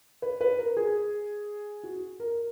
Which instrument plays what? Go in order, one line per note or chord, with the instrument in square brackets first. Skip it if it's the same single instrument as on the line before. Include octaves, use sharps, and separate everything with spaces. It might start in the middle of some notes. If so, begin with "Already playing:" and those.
[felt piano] B4
B4
A#4
G#4
F#4
A#4